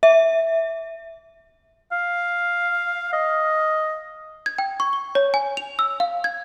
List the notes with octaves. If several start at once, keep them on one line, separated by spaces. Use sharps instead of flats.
E5
F5
D#5
G#6
G5
C#6
G7
C#5
G#5
F7
E6
F5
G#6